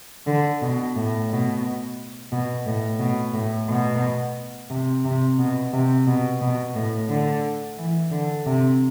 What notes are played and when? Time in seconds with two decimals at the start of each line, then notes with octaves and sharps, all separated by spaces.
0.27 D3
0.62 B2
0.96 A2
1.30 B2
2.32 B2
2.66 A2
3.00 B2
3.34 A2
3.69 B2
4.70 C3
5.05 C3
5.38 B2
5.73 C3
6.07 B2
6.41 B2
6.75 A2
7.09 D3
7.78 E3
8.11 D3
8.46 C3